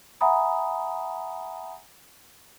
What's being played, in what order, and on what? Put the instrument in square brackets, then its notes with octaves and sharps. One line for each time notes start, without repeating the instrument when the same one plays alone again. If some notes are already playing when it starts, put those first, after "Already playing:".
[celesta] E5 F#5 G#5 A#5 B5 D#6